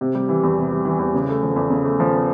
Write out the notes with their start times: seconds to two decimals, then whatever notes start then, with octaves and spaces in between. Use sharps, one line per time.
0.01 C3
0.15 G3
0.29 E3
0.43 E2
0.58 C3
0.72 G3
0.85 E3
0.99 E2
1.14 C#3
1.29 A3
1.43 F3
1.56 E2
1.70 C#3
1.85 A3
2.00 F3